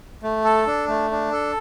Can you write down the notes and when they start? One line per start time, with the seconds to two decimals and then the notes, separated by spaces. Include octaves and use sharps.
0.23 A3
0.44 A4
0.67 D4
0.88 A3
1.11 D4
1.32 A4